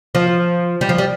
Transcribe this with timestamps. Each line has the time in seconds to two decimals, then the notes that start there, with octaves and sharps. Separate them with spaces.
0.15 F3
0.81 G3
0.89 F3
0.98 G3